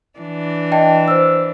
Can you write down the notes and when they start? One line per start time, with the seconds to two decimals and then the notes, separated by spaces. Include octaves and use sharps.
0.20 E3 D4
0.72 D#5 G5 A5
1.08 C5 E6